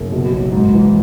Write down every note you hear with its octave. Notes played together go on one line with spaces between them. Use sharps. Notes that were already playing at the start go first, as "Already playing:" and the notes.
Already playing: F#1
B2
B1
G#2
E3